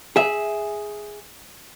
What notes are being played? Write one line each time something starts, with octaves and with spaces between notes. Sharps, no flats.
G#4 E5